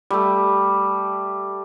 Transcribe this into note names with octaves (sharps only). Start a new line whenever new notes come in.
G3 A3